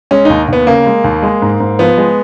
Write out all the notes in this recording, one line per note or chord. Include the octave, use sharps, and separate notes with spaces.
G#3 C#4
D#2 D#4
D#2 B3
C#3 A#3
G#3
D#2
G#3
G#2
G#2
F3 B3
G#3